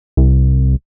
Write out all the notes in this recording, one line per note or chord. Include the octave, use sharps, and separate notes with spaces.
C2